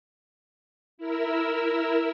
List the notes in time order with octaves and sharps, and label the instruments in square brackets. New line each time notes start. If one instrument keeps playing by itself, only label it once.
[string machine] E4 A#4 E6